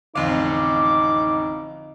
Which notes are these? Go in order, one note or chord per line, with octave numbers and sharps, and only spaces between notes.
A1 F2 D3 C4 D#4 F5 D6